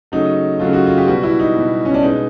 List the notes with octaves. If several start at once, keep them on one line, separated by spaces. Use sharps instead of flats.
C#3 F#3 A3 D#4
C#3 F#3 A3 F4
F#4
F4
G4
B2 G3 F#4
E4
D#4
B2 G3
C#4
D4
B2 G#3 D#4